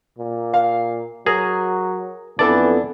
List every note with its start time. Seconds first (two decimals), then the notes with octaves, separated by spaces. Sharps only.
0.18 A#2
0.54 F5
1.26 F#3 G#4 A#4
2.39 F2 E3 B3 D4 A4 D5